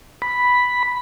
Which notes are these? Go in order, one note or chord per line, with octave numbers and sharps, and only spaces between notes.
B5